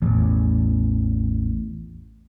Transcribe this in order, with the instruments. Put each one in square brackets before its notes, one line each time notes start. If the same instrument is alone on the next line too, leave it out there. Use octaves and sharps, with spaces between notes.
[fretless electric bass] A1 E2